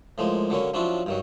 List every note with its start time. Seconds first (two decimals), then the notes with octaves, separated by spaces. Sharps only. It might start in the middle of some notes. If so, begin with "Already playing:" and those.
0.18 A2 F3 G#3 A#3
0.50 D3 F#3 A#3 C#4
0.74 F3 F#3 C#4 D4 E4 F4
1.06 G2 D#3 F#3